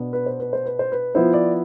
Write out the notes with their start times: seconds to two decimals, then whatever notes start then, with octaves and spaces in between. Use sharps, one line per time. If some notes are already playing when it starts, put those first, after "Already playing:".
Already playing: B2 B3 D4
0.13 B4
0.26 C5
0.40 B4
0.53 C5
0.66 B4
0.79 C5
0.92 B4
1.15 F3 B3 E4 C5
1.34 D5